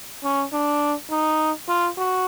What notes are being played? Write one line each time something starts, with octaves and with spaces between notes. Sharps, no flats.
C#4
D4
D#4
F4
F#4